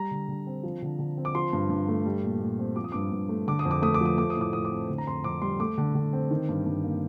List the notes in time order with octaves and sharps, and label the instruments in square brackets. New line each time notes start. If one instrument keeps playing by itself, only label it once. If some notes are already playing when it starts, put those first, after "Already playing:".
Already playing: [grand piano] G3 A#5
D3
D3
C4
F3
D3
D3
C4
D6
F3 C6
G2
G2
A3
G3
A#2
A#2
C4
F3 D6
D#6
G2 D6
G2
A3
D3 D6
D#6
F2
D6
A3 D#6
D6
F3 D#6
A3 D6
D#6
A2 D6
A2 D#6
D6
C4
D3
A#5
F2 C6
F2 D6
G3 C6
A3 D6
D3
D3
C4
D#3
G2
G2
A#3